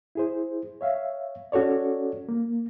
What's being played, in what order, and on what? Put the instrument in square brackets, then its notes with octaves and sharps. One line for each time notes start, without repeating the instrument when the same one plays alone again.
[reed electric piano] E4 G#4 C5
C#5 E5 F5
C#4 F#4 A4 C#5 D5
A#3